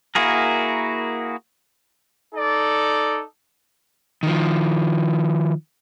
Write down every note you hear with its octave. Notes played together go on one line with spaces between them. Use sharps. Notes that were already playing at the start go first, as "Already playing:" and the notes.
A#3 E4 F#4 G#4 A#4
D#4 A4 D5
D#3 F3